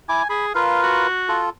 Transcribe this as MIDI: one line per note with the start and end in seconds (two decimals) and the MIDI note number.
0.09 0.22 64
0.09 0.28 80
0.09 0.22 86
0.30 0.52 68
0.30 0.45 83
0.55 1.07 65
0.55 1.07 70
0.55 1.07 71
0.55 0.79 77
0.83 1.40 66
1.29 1.50 65
1.29 1.50 69